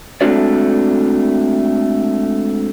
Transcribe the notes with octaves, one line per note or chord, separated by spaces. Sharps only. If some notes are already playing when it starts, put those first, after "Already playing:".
G#3 A3 C4 D4 F#4 D5